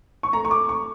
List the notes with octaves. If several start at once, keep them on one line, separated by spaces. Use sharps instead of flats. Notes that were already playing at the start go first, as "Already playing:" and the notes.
C#6
A3 A#5
C#6
D6
C#6